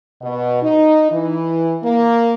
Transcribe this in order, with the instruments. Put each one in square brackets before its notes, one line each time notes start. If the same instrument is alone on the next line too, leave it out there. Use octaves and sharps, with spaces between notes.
[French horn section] B2
D#4
E3
A#3